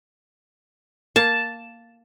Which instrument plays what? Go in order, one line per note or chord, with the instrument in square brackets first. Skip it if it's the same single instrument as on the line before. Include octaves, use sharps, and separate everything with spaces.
[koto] A#3 [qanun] A5